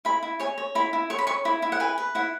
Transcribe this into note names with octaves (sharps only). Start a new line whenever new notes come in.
E4 B5
E4
C#5 G#5
C#5
E4 B5
E4
C#5 C#6
B5
C#5 C#6
E4 B5
E4
F#5
B4 G#5
B4
E4 F#5